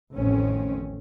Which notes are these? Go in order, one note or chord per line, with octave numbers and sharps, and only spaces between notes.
A1 F2 D#3 C4 C#4